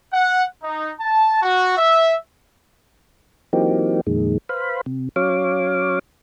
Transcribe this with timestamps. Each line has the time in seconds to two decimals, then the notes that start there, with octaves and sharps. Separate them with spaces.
0.12 F#5
0.63 D#4
1.01 A5
1.42 F#4
1.78 E5
3.53 E3 F#3 A#3 C4 D#4 G4
4.07 F2 A#2 D#3 G#3
4.49 B4 C5 F5 B5
4.86 C3
5.16 F#3 C#4 C#5 F5 D6